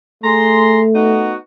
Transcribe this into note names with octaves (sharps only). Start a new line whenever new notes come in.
A3 G#4 A#5 C6
B3 D#4 F#4